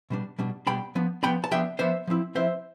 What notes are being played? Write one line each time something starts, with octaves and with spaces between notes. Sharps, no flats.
B2 G3 D4
B2 G3 D4
B2 G3 D4 G5 B5
F3 B3 D4
F3 B3 D4 G5 B5
A5
F3 B3 D4 E5 G5
F3 B3 D4 C5 E5
F3 C4 E4
F3 C4 E4 C5 E5